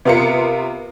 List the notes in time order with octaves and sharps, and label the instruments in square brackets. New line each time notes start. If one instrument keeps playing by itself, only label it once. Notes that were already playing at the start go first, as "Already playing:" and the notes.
[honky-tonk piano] C3 B3 F4 A#4 C#7